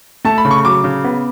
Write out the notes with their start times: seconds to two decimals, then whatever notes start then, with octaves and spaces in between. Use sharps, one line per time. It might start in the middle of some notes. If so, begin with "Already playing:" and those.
0.25 A3 A5
0.38 B5
0.45 C#3
0.51 C#6
0.65 F#3 D6
0.84 C#3
1.04 B3